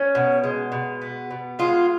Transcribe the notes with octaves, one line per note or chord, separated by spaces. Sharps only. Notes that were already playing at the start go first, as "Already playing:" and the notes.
Already playing: C#4
B2
G#3
B2
B3
B2
G#3 F4